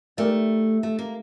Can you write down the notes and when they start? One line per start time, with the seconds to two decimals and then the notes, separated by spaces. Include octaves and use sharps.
0.17 A3 D#4 G4 A#4 D5
0.83 A3
0.99 A#3